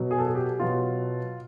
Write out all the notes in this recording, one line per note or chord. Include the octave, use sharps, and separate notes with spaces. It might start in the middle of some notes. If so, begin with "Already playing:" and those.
Already playing: B2 F#3
G#4
A4
G#4
G4
B2 F#3 F4